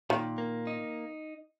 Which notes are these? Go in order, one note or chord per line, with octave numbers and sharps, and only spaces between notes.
A#2 D#3
A#3
D#4